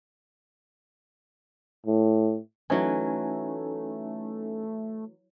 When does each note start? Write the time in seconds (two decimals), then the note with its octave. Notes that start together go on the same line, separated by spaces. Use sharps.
1.86 A2
2.70 E3 F#3 A3 C#4 D#4 G#5